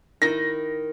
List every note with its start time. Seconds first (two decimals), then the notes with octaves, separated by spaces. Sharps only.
0.22 D#3 E4 A#6